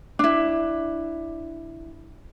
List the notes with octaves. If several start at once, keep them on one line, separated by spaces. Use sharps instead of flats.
D4 E4